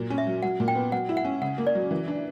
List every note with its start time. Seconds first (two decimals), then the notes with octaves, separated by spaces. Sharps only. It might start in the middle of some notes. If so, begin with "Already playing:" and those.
Already playing: A#2 F#3
0.10 C#4
0.18 E5
0.27 F#3
0.43 F#3 F#5
0.60 A#2
0.68 G5
0.75 B3
0.92 F#3 F#5
1.09 E4
1.17 F#5
1.25 C#4
1.42 C#3 F#5
1.58 A#3
1.67 D5
1.75 F#3
1.91 E3
2.08 D4